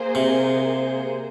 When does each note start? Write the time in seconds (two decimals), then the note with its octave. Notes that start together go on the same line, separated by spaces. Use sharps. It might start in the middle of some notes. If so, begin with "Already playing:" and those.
Already playing: A#3 G#4 C5
0.15 C3